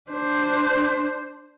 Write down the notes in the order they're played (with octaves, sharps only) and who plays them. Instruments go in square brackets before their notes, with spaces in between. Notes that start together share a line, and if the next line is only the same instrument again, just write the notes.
[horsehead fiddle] D4 C5